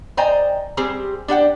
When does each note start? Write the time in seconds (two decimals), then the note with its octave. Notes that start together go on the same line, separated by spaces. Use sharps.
0.17 C5 D5 D#5 G5 G#5 A#5
0.77 G3 C4 G4 G#4 C5
1.28 D4 G4 F#5 G5